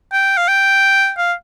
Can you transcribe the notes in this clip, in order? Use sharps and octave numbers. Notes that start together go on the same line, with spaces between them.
G5
F5
G5
F5